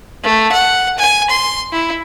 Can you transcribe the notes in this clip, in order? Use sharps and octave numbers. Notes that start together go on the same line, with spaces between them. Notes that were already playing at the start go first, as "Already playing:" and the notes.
A3
F#5
G#5
C6
E4